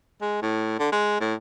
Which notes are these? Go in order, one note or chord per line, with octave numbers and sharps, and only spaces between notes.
G#3
A2
D3
G#3
A2